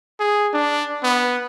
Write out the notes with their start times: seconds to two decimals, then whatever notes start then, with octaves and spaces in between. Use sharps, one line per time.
0.20 G#4
0.53 D4
1.03 B3